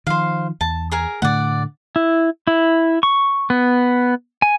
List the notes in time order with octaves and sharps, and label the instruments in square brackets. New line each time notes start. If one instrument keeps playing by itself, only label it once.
[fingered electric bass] D#3 F3 [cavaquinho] C5 F5
[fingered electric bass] E2 [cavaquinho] A5
[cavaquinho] G#4 A#4 G#5
[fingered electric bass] A2 D3 A3 [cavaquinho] D5 F#5
[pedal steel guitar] E4
E4
C#6
B3
G#5